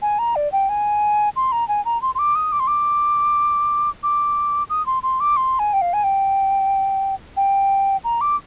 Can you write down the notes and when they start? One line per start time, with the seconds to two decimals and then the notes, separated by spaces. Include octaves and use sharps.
0.02 G#5
0.19 A#5
0.36 D5
0.52 G5
0.69 G#5
1.36 C6
1.52 A#5
1.68 G#5
1.85 A#5
2.02 C6
2.15 C6
2.19 D6
2.35 D#6
2.52 D6
2.60 C6
2.67 D6
4.03 D6
4.70 D#6
4.86 C6
5.03 C6
5.20 D6
5.37 C6
5.59 G#5
5.73 G5
5.81 F5
5.93 G#5
6.04 G5
7.37 G5
8.04 A#5
8.21 D6